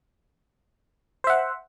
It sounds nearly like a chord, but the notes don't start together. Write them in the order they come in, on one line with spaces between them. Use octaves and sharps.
C5 E5 F#5